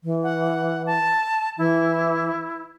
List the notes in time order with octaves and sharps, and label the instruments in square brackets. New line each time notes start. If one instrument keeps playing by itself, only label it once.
[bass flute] E3
[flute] F#5
A5
[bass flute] E3 [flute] E4